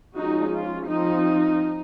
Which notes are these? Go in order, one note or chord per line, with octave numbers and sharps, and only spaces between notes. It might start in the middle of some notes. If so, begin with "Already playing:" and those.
F3 G#3 C#4 D#4 F#4
F4
F3 C4 D#4